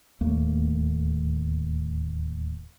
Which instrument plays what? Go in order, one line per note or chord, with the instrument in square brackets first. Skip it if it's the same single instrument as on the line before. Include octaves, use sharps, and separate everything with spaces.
[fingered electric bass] D1 D#2 A3 A#3